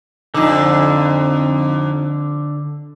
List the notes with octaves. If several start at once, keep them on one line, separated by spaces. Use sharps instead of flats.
F2 D3 D#4